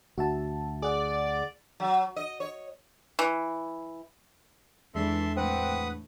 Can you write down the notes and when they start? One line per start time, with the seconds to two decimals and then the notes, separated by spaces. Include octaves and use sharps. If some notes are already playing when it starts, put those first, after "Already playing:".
0.18 D2 F#4 E5 A5
0.82 G#4 D5 F#5
1.80 F#3
2.16 D#5
2.40 C#5
3.19 E3
4.95 E2 E3 G#3 D4 A4 E5 C6
5.37 A2 E3 A3 C4 B4 F#5 D#6